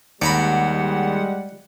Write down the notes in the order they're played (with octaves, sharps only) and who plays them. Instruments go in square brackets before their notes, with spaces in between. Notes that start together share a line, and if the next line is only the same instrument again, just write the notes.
[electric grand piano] D#2 [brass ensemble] G3 G#3 [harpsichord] D5 A#5 B5 [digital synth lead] F#5